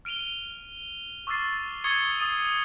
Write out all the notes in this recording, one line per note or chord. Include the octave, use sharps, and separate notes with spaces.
F6 D7 D#7 F7 G7
C#6 D6 E6 F6 A6 C7
C#6 D#6 G#6 A6 C#7 G7
D#6 A6 D#7